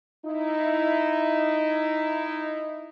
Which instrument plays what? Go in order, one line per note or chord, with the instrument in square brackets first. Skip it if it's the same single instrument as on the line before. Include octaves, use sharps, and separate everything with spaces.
[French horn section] D#4 E4